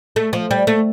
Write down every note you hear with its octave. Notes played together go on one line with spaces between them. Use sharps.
A3
F3
G3
A3